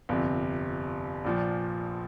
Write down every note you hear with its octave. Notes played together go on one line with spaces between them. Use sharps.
G1 F2 C3
A#1 A#2 F3